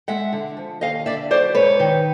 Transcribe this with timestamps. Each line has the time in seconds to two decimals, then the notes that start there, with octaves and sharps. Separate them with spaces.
0.08 G#3 E5 F#5
0.32 D3
0.57 F3
0.81 D#2 D#5 F5
1.06 D3 D5 E5
1.31 F#3 C5 D5
1.55 G#2 B4 C#5
1.80 D#3